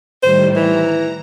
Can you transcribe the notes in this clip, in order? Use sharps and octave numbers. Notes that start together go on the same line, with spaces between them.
A2 D#3 G3 C5
E3 A#5